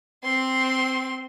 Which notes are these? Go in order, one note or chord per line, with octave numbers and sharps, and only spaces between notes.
C4 C6